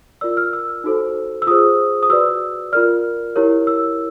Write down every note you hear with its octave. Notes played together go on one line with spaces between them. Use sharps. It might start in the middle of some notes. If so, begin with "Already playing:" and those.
F4 A#4 D5 E6
F6
E6
D#4 F#4 A4 C5
E6
F4 G#4 C5 D#6
D#6
F#4 B4 D5 E6
F4 A#4 D5 F6
E4 G4 A#4 C#5
E6